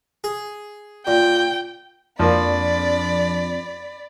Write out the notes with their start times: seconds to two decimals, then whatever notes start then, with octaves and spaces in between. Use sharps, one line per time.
0.24 G#4
1.07 A#2 G5
2.19 F2 F3 A#3 D4 D5 B5